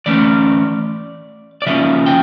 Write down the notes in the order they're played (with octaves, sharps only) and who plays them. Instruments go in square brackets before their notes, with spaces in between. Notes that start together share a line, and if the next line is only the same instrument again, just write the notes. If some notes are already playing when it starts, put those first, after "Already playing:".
[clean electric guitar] E3 A3 C#4 D5
D5
C#3 F3 A#3 C#4 E5
G5